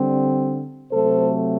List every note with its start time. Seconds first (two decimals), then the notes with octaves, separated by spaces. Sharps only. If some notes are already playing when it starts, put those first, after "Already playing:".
Already playing: D3 G3 C4
0.91 C3 F#3 A3 C4 A4 C5